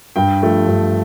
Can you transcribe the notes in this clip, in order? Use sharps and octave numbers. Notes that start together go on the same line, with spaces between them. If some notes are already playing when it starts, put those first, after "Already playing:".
G2 G5
F3 A3
G2